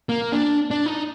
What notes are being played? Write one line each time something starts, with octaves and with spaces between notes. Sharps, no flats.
A#3
D4
D4
D#4